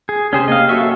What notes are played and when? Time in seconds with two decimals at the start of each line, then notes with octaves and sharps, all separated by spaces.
0.09 G#4
0.33 C3 C#4 G#4 C5
0.48 A#3 D#5 F5
0.69 F#2 F#4 A4 E5 C#6